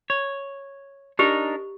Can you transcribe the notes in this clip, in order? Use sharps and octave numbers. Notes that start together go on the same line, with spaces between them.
C#5
D4 D#4 G4 A#4